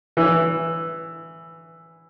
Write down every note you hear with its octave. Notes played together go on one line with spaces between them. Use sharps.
E3